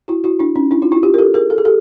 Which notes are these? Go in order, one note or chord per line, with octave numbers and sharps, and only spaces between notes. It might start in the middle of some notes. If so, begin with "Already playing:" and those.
E4 F#4
E4 F#4
D4 E4
C#4 D#4
D4 E4
D#4 F4
E4 F#4
F4 G4
A#4
G4 A4
G#4 A#4
A4
G#4
G4 A4